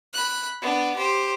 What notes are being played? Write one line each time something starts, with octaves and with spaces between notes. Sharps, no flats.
B5 F#6
B3 D4
G4 C5